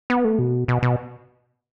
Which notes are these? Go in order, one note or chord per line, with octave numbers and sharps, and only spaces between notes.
B3
A3
B2
B2
B2